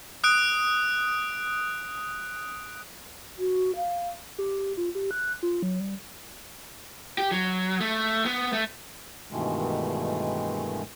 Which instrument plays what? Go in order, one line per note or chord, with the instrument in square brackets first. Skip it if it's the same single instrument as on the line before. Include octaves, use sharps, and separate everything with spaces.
[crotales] D#6 F#6 D7
[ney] F#4
F5
[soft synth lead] G4
G4
F4
G4
F#6
F4
F#3
G3
[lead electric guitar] G4
F#3
A3
B3
A3
[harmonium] G2 B2 D#3 E3 G#3 A3